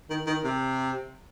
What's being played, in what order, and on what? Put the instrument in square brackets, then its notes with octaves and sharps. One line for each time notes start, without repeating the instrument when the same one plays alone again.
[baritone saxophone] D#3
D#3
C3